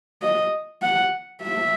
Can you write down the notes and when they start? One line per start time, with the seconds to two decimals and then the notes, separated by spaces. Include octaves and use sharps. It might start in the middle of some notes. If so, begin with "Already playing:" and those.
0.22 D#5
0.82 F#5
1.43 E5